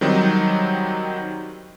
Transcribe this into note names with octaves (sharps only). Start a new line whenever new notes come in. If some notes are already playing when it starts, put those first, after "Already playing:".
D#3 F#3 G3 C4 D#4